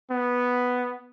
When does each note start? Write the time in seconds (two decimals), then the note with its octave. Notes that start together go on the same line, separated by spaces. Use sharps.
0.11 B3